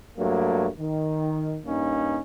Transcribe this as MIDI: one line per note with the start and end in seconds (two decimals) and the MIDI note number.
0.18 0.68 43
0.18 0.68 54
0.18 0.68 57
0.18 0.68 58
0.79 1.57 51
1.66 2.19 43
1.66 2.19 58
1.66 2.19 61
1.66 2.19 63